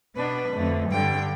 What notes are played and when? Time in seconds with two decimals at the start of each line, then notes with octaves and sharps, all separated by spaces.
0.15 B2 B3 D4 B4
0.53 F2 D3 A3
0.90 G2 D3 G3 G5